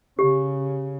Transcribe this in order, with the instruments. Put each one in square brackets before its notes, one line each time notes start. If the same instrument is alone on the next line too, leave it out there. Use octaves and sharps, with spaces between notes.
[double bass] C#3 [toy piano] G4